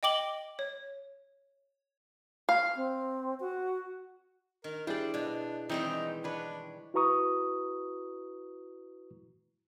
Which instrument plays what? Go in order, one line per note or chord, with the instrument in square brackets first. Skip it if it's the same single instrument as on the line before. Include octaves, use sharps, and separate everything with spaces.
[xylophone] D#5 G5 D6 F#7 G7
C#5
[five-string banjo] F5
[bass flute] C4
F#4
[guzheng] D#3 [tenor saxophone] A#4
[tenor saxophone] G3 [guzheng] D4 [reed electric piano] E4 G#4 [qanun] C5 D5
[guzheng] B2 [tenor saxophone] D4
[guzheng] D#3 G3 G#3 [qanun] E3 C4 C6 [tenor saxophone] D#4
[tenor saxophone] D4 [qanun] B4 C#5
[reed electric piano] E4 F#4 B4 A#5 C#6 D#6